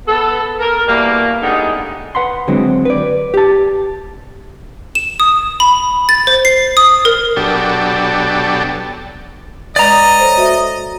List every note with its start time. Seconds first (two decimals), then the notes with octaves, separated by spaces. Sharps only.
0.07 B3 A4
0.60 A#4
0.87 E2 B2 G3 A3 A#3
1.42 A2 D3 G3 G#3 B3 D#4
2.15 B4 F#5 B5 C6
2.48 D3 F#3 G#3 C4
2.85 B4 D5
3.34 G4 A5
4.95 E7
5.20 D#6
5.60 B5
6.09 A6
6.27 C5
6.45 C7
6.77 D#6
7.05 A#4
7.36 B2 F#3 D4 G4 A4
9.76 G#3 B4 D5 D#5 G#5 A#5
10.19 A4 C5 C#5
10.37 F#4 E5